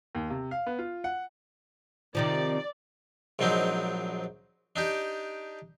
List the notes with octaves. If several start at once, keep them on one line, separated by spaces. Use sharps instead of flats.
D#2
C3
F5
B3
F4
F#5
C3 D#3 F3 D5
A#1 G#2 F#3 C4 D4 D#4
D4 D#4 G4